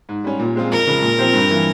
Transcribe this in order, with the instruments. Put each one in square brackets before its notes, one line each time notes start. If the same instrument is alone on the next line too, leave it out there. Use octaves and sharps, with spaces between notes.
[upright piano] G#2
G3 C#4
A#2
G#3 C4 F4 G#4
[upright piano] F2 [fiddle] A#4
[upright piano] C#3 F3 G#3
A#2
F3 C4 G4 C5
G2
E3 A#3